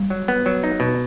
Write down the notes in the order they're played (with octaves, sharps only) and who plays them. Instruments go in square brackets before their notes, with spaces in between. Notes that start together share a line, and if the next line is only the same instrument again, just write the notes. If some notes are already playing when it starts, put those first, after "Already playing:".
Already playing: [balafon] G3
[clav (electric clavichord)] F#3
B3
F#3
D#4
B2